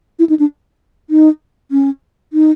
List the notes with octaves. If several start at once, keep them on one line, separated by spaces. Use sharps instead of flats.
E4
D#4
D4
D#4
C#4
D#4